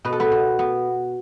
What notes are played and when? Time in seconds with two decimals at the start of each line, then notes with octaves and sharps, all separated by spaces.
0.05 B2 B4
0.12 A4
0.20 B3 B4
0.32 B2
0.59 B3